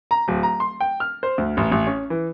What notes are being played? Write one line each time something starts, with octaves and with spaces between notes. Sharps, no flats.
A#5
D1
A#5
C6
G5
F6
C5
D2
A1
A1
C#4
E3